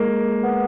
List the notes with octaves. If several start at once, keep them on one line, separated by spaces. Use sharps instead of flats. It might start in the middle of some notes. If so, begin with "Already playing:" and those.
Already playing: G#3 A#3
B3